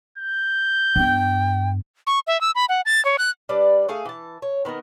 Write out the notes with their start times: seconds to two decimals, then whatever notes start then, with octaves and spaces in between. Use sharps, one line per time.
0.18 G6
0.96 G2 B3 G5
2.07 C#6
2.27 E5
2.41 E6
2.55 B5
2.69 F#5
2.86 A6
3.05 C#5
3.19 F#6
3.49 G3 D4 B4 D5
3.89 A3 G#4 F5
4.05 E3 A5
4.42 C#5
4.65 D#3 B3 D#4 A#4